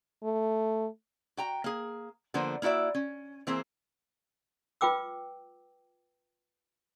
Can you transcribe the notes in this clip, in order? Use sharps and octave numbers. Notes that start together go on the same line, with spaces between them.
A3
F#4 G5 A#5
A#3 G#4
D3 F3 A#3 B3 C5
A#3 E4 F#4 D5 E5
C#4
E3 A#3 C4 G#4 C5
F4 B4 G5 D6 E6